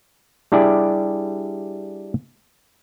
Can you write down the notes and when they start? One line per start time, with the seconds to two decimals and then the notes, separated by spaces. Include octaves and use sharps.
0.52 G3 D4 E4 G4 G#4 D5